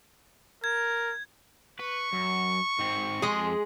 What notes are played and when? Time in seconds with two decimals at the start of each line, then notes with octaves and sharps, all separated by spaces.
0.64 A#4 G#6
1.80 B4 C#6
2.13 F#2
2.79 G#2 C4
3.22 F2 G#3 G#4 C6